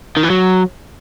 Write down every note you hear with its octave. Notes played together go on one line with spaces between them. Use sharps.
D#3
E3
F#3